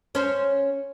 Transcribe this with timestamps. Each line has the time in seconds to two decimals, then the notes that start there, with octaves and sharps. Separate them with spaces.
0.15 C#4 C5